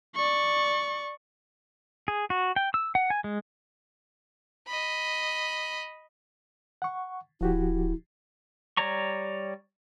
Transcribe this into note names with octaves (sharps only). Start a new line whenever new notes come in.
D5 C#6
G#4
F#4
G5
E6
F#5
G#5
G#3
D#5 B5
F#5 C#6
D1 F3 E4 F#4 G4
G3 C#5 D5 A#5 C#6